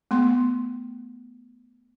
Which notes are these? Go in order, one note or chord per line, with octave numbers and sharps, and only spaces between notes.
A3 B3 C6